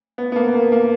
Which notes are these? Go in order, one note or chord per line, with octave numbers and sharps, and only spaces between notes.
B3
B3
A#3
A#3
A#3